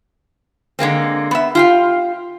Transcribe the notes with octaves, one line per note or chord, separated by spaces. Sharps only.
D3 G#3 A#3 C4
B3 E5
F4 G4 F5